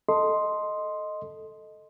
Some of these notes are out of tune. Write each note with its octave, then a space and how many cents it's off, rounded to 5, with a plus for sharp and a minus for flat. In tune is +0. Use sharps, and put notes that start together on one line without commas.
A4 +0 D#5 +0 C6 +0